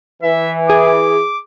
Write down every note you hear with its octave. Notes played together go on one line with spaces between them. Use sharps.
E3 E5
G#4 D6